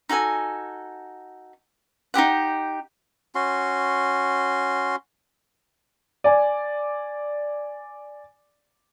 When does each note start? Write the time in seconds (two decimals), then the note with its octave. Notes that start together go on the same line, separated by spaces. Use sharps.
0.09 D#4 F#4 A4 G#5
2.14 D#4 F4 G4 F#5
3.35 C#4 F#4 C6
6.24 D5 G#5